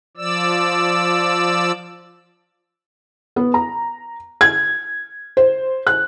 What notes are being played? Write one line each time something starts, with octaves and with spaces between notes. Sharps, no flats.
F3 D5 E6
B3
A#5
G#6
C5
F#6